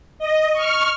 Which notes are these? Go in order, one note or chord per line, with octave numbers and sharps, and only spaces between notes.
D#5
C#6 F6